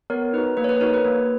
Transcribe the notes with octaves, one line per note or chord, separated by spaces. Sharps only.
B3 A#4 C#5
D#4 F#4 B4
A#3 B4
C#5
B4
D#4 F#4 A#4 C#5
B4
A#3